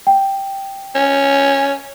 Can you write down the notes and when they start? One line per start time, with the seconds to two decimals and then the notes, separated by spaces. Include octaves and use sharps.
0.07 G5
0.95 C#4